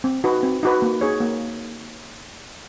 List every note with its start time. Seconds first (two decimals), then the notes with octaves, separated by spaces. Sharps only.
0.04 C4
0.24 D#4 F#4 B4
0.43 C4
0.63 D#4 F#4 B4
0.82 A#3
1.01 D#4 G#4 C#5
1.20 A#3